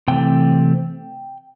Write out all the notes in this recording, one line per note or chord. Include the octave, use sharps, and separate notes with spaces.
C3 E3 A3 C4 G5